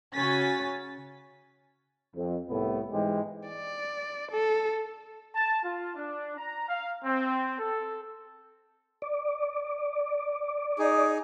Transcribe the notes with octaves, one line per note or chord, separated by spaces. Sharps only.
C#3 C#4 F#4 G#5 A6 B6
F2
C2 A2 A3 B3
G#2 E3 G#3 G4
D5
A4
A5
F4
D4
A#5
F5
C4
A4
D5
D#4 G#4